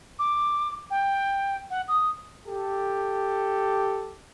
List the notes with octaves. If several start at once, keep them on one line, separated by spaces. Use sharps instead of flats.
D6
G5
F#5
D#6
G4 A4